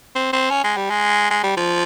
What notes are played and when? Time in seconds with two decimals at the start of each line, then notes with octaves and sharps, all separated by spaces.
0.15 C4
0.33 C4
0.50 C#4
0.64 G#3
0.77 G3
0.90 G#3
1.31 G#3
1.43 G3
1.57 F3